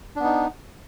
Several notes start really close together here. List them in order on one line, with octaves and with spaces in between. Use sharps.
D4 B3 D#4